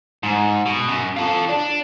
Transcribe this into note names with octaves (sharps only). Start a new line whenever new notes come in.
G#2
B2
F#2
F4 A4
D4